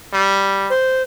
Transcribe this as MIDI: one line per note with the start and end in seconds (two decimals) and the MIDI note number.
0.13 0.70 55
0.70 1.03 72